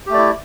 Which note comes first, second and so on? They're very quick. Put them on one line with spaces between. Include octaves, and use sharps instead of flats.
G4 A3 D5 E4